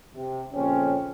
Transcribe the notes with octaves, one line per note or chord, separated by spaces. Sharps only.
C3
F2 A#2 C#3 C4 C#4